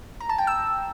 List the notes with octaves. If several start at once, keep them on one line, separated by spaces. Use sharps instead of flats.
A#5
A5
G5
E6